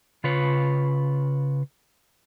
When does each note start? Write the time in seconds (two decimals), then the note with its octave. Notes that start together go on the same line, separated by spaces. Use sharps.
0.24 C#3 F4 B4 C#5